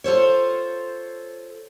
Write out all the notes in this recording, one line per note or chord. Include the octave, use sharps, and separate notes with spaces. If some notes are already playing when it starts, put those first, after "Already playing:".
F4 A4 C5 C#5